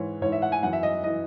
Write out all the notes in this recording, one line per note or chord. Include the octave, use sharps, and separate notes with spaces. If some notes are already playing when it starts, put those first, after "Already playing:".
Already playing: G#2 E3 C#5
G#2 E3 C#5
E5
F#5
G#5
F#2 E3 F#5
E5
D#5
E3 D#5